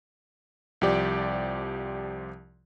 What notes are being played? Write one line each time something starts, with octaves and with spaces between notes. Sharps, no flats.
C2 F3 G4 D5